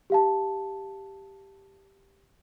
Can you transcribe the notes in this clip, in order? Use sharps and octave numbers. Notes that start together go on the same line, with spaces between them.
G4 F5 A5